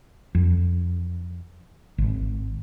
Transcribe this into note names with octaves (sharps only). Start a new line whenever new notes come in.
F2
G#1